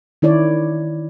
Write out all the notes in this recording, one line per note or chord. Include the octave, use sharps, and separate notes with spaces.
D#3 E4 C#5 D5